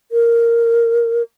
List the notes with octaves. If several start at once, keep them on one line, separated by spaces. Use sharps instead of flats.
A#4